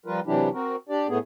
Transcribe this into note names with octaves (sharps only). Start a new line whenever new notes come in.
F3 G3 F4 A#4 B4
C3 E3 F#3 D4 E4 G4
C4 F#4 A#4
D4 G4 D5
A2 A3 B3 G#4